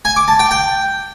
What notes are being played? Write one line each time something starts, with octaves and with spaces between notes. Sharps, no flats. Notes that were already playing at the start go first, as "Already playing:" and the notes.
G#5
D6
A5
G5
G5